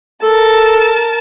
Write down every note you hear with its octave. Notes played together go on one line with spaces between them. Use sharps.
A4 A#4 A5